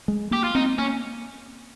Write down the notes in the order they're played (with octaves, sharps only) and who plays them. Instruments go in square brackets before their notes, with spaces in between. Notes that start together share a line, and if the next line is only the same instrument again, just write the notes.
[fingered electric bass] G#3
[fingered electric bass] A#3 [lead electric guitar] G4
[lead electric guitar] F4
[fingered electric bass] C4 [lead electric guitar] D#4
[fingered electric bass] A#3 [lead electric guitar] C#4